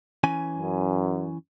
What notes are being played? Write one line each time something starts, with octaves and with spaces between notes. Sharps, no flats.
E3 C#4 G#5
F#2